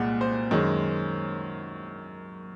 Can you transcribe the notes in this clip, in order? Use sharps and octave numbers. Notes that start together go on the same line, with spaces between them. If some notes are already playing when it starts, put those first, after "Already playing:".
Already playing: C2 A#2 G#3 F#5
C5
F#2 D#3 G#3